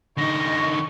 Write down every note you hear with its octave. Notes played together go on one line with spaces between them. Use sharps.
D3 D#4 C#6 A#6